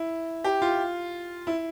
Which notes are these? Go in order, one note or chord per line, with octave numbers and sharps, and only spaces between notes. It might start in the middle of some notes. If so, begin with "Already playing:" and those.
Already playing: E4
G4
F4
E4